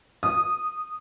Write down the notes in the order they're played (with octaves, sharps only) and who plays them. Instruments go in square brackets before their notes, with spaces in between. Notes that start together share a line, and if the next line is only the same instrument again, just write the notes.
[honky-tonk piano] D#6